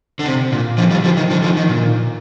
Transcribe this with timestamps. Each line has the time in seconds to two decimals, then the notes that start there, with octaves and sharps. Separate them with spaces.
0.19 D3
0.26 C3
0.52 A#2
0.78 D3 F3
0.91 D#3 G3
1.04 D3 F3
1.17 D#3
1.30 D3 F3
1.43 D3 F3
1.57 D#3
1.69 A#2